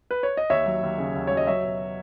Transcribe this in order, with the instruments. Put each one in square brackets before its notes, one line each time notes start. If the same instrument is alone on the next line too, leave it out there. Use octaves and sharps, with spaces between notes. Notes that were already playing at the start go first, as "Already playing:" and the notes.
[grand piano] B4
C#5
D#5
D#2 C#5 E5
F#3
D#2
C#3
D#2
F#3 C#5
D#5
F#3 C#5 E5
B2